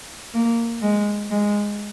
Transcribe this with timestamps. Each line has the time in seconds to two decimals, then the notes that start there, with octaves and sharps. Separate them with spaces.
0.34 A#3
0.82 G#3
1.31 G#3